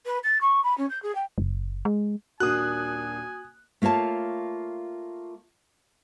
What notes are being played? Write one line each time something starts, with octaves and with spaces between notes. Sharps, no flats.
B4
A6
C#6
B5
C#4
G6
G#4
G5
F#1
G#3
D#1 A#3 D4 F#4 G#5 D#6 F#6
A3 A#3 F4 C#5 A5